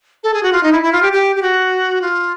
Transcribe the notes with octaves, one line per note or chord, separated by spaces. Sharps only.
A4
G#4
F#4
F4
D#4
E4
E4
F4
G4
G4
G4
F#4
F4